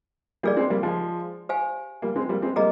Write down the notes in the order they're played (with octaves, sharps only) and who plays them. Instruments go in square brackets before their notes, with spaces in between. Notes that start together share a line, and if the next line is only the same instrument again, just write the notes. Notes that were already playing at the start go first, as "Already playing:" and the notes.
[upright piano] G3 A#3 [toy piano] D4 G#4 D5
[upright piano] G#3 C4
G3 A#3
F3 G#3
[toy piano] G4 C5 F5 G#5
[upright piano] G3 A#3
G#3 C4
G3 A#3
G#3 C4
[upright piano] G3 A#3 [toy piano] G#4 D#5 A#5